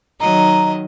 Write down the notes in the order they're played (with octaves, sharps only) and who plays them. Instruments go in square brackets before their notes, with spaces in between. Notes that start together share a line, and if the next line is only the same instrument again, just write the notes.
[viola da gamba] D#3 F#3 D#5 [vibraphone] A#5